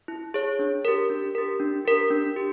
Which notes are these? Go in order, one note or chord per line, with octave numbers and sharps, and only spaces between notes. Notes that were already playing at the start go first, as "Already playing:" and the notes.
E4
G#4 C#5
D4
G4 A#4
D4
G4 A#4
D4
G4 A#4
D4
G4